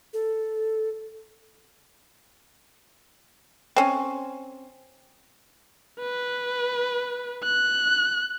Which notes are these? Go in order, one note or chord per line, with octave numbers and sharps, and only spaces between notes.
A4
C4 C#4
B4
F#6